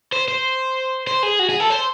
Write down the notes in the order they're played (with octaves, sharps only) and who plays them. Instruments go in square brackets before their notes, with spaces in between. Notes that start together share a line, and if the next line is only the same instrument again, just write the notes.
[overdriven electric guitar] C5
C5
C5
G#4
F#4
G#4
A4
C5